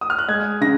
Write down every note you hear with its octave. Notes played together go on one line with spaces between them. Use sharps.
D#6
F6
F#6
G#3 G#6
C#3 A#6